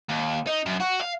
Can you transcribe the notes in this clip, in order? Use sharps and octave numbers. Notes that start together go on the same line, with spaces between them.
D#2
D#4
F#2
F#4
F5